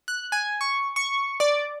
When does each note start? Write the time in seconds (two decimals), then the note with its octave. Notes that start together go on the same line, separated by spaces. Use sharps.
0.08 F#6
0.32 G#5
0.61 C#6
0.96 C#6
1.40 D5